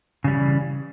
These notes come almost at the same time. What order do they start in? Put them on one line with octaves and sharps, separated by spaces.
C#3 G3 E3